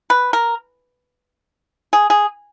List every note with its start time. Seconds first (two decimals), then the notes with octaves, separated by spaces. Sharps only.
0.10 B4
0.33 A#4
1.93 G#4
2.10 G#4